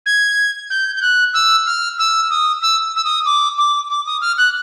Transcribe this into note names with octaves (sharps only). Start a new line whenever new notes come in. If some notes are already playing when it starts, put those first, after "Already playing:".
G#6
G6
G6
F#6
E6
F6
E6
D#6
E6
E6
D#6
D6
D6
D6
D#6
F6
F#6